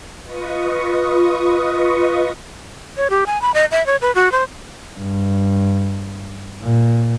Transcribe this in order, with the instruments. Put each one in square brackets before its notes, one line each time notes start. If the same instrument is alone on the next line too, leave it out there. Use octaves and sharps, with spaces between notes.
[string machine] F4 B4 D#5 C#6 D#6
[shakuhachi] C#5
G4
G#5
B5
D#5
E5
C#5
B4
F#4
C5
[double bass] G2
A#2